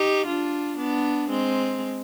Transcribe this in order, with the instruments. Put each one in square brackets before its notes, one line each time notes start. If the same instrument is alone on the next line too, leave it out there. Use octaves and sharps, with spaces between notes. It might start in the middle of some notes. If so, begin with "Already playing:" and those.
Already playing: [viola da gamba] D#4 G4
D4 F4
B3 D4
G#3 C4